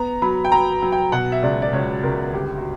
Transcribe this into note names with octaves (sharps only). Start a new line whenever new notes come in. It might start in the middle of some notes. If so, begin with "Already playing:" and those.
Already playing: B3 A#5
F#3 B5
G5
F#3 A#5
F#3
G5
B2 F#5
E5
C#2 D5
D5
C#2 C#5
C#2 A#4
G1 G4
F#4